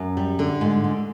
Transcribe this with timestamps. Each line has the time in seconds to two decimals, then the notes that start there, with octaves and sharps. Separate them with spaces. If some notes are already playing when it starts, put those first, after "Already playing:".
Already playing: F#2
0.17 G3
0.39 D3
0.61 G#2
0.84 G#2